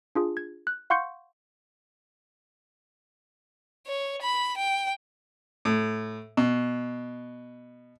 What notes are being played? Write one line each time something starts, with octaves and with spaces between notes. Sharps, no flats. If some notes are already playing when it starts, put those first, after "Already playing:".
D4 F4 G#4
G#6
F#6
F5 F#5 C6 C#6 G6 C#7
C#5
B5
G5
A2
B2